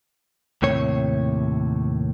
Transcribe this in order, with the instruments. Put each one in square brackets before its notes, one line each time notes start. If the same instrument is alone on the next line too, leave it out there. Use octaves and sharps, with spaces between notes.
[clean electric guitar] D#2 A2 C3 C#5